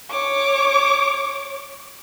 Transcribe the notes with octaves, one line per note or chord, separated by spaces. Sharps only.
C#5 D6